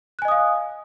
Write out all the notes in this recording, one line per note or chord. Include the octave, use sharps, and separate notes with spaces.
D#5 F5 G#5 D#6 F#6